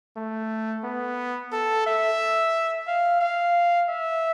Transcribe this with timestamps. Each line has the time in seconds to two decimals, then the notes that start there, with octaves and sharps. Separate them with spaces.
0.17 A3
0.84 B3
1.52 A4
1.86 E5
2.87 F5
3.21 F5
3.89 E5